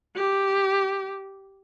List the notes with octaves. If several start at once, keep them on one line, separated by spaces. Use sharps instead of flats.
G4